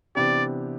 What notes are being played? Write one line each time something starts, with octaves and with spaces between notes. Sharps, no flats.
C3 E3 B3 D4 G4 D5